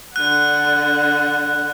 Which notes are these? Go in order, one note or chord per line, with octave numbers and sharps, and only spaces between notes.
D3 F#5 F#6